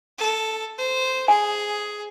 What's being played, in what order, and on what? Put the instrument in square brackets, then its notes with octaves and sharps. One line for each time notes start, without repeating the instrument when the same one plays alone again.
[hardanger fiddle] A4
C5
[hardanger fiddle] G#4 [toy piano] G#5